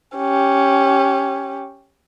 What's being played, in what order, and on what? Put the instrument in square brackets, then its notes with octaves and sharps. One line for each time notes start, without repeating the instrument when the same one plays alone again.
[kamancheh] C#4 G4